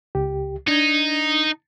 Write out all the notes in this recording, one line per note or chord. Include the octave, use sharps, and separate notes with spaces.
C#2 G4
D4 D#4 G#6